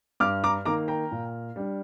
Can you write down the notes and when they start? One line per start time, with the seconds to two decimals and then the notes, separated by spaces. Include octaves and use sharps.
0.20 G2 D6 F6
0.44 A#5 D6
0.65 D#3 A#3 A#5 D6
0.88 G5 A#5
1.11 A#2
1.56 G3 D4